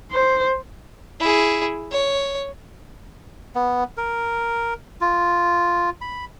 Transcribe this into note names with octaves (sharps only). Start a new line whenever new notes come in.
C5
E4 G#4
C#5
B3
A#4
F4
B5